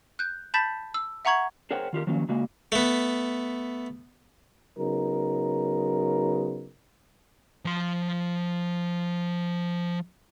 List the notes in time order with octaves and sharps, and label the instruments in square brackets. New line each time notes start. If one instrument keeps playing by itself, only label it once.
[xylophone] F#6 G6
A5 B5 G6 A6 B6 E7
E6
E5 F#5 A#5 C#6 G#6 F#7
[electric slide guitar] G#4 A#4 C5 C#5 F#5 G5
D#3 F4 G4 A#4
D#3 F3 F#3 A#3 C#4
C#3 G#3 A#3 F#4
[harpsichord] A3 B3
[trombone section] C#3 F#3 B3 D#4 A#4
[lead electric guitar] F3 C6